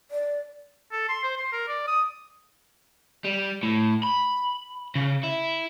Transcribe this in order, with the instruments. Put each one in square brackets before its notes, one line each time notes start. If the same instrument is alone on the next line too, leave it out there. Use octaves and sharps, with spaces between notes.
[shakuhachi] D5
[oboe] A4
C6
C5
C6
A#4
D5
D#6
[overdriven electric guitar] G3
A2
B5
C#3
E4